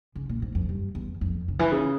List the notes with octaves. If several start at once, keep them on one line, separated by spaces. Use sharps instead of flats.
C#3
A#2
G#2
F2
G2
E2
F2
C#3
E3
C#3